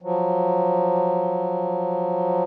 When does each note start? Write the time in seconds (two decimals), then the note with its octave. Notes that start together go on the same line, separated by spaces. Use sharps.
0.02 F3 F#3